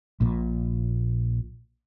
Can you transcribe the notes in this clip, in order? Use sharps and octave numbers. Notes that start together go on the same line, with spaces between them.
A#1 A#2